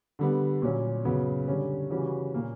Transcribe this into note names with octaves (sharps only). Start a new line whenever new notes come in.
D3 G3 B3
A#2 F#3 C#4
F#2 C#3 F#3 B3
D3 G3 C#4
C#3 E3 G3 C#4 F#4
A#2 A#3 C#4